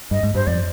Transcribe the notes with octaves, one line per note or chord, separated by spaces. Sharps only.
G2 D#5
G#2
G2 C5
F2 D5